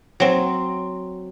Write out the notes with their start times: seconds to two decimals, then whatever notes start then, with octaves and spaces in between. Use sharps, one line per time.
0.20 F#3 C4